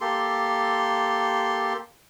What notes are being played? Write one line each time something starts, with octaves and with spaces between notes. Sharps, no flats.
A#3 G4 A4 C6